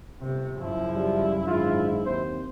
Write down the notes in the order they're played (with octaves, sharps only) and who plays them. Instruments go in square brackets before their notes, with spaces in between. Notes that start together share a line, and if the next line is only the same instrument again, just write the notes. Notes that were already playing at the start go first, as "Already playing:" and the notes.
[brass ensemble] G1 [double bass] C3
[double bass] F#2 E4 [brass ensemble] C#3 E5 [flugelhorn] F3
[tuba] G3
[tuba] G#2 [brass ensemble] D#3 E3 D4 [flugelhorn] F4
[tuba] D#2 [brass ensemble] C4 [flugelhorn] C5